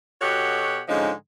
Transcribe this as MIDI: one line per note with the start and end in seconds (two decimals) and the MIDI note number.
0.21 0.81 47
0.21 0.81 66
0.21 0.81 67
0.21 0.81 69
0.21 0.81 73
0.21 0.81 78
0.89 1.11 44
0.89 1.11 50
0.89 1.11 53
0.89 1.11 56
0.89 1.11 61
0.89 1.11 63